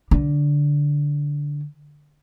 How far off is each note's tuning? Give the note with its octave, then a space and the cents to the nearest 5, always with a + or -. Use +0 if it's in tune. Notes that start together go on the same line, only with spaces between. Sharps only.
D3 -10